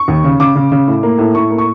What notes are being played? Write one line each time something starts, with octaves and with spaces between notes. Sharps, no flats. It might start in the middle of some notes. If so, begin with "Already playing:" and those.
Already playing: C#6
D#2
C#3
C#3 D6
C#3
C#3
A2
A#3
A2
A2 C#6
A#3
C#6